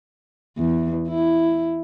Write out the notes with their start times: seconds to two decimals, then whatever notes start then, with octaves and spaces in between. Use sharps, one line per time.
0.57 E2
1.09 E4